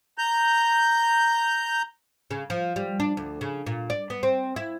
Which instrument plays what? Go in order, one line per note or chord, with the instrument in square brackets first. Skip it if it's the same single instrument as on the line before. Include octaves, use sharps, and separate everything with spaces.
[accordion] A#5 G6
[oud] C#3
F3
G3
D4
D2
C#3
A#2
D5
B3
C4
E4